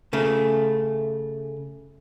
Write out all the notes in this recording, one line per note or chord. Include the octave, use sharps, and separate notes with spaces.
C#3 A3